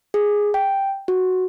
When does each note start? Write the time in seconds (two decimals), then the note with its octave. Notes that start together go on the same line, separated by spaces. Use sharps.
0.14 G#4
0.54 G5
1.08 F#4